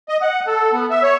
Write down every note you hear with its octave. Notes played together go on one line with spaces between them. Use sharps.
D#5
F#5
A4
B3
E5
C#5